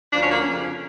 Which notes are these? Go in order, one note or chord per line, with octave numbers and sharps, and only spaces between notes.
D2 D3 F3 D4
C#4
A#3
C#4
F2 C#3 F3